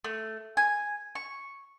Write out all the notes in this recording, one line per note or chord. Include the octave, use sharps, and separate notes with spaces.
A3
G#5
C#6